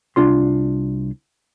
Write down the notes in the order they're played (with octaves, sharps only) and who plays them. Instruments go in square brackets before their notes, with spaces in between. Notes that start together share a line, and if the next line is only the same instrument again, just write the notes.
[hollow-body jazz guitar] C2 D4 F4 C6